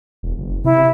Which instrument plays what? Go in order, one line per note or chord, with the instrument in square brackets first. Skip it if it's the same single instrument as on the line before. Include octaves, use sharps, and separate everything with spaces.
[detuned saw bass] E1
F#1
[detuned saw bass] C3 [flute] E4